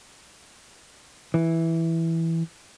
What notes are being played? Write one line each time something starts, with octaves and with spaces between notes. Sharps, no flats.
E3